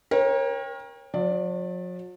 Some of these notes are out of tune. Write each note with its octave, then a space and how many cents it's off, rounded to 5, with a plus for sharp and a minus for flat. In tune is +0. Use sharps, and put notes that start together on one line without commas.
A#4 +25 C#5 -30 G5 +25
F#3 -45 D5 +0